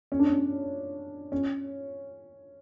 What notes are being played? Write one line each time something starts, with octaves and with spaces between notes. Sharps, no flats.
C#4
D4
C#4
C#4